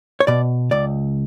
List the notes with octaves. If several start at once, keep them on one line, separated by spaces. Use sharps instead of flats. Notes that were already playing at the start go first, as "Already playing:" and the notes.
C#5
B2 D5
C#2 D5